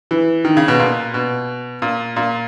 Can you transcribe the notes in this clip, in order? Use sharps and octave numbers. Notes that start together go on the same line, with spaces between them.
E3
D#3
C#3
B2
A#2
B2
A#2
A#2